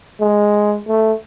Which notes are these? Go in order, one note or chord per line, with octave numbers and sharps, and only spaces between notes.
G#3
A3